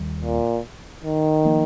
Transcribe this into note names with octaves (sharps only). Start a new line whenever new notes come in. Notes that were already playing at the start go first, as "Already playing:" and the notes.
Already playing: D#2 D#3 G3
A#2
D#3
F3 A#3